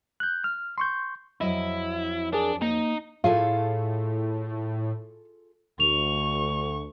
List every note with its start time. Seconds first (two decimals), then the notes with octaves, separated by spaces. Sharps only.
0.20 F#6 G6
0.44 F6
0.78 C6 C#6 G6
1.41 F2 F#3 E4 D#5
2.33 D4 G#4 A#4
2.62 A#3 D#4
3.24 A2 F4 G#4 A4 F5
5.80 D2 C#6 F7